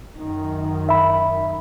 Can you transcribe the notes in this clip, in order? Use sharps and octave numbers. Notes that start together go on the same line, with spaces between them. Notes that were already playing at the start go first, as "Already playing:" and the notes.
F#2 D#3
E5 B5